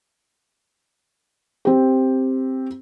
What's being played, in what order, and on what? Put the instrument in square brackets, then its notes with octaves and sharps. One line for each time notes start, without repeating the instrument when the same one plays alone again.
[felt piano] C4 G4